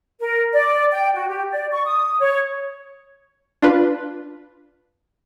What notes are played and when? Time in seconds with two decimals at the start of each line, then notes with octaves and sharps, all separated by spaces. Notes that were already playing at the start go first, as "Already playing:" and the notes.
0.20 A#4
0.53 D5
0.92 G5
1.14 F#4
1.29 G4
1.51 D5
1.71 C#6
1.85 D#6
2.20 C#5
3.62 D4 F4 B4